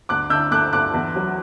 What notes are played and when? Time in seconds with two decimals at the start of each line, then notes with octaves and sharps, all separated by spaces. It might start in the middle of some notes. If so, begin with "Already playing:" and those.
0.09 D2 D6 F#6
0.30 D3 E6 G6
0.51 A3 D6 F#6
0.73 D2 D6 F#6
0.94 E2
1.16 F#3